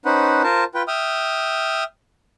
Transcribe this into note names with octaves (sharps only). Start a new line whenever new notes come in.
C#4 D#4 B4 C5 F#5
F4 A#4 C5 A5
F4 B4 G5
E5 G5 D#6 F6